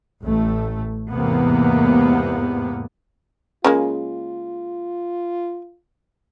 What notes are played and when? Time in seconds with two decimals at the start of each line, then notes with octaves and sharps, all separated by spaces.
0.24 A1 A3
1.11 E2 G#2 C3 A#3 B3
3.64 C#3 G#3 A#3 F4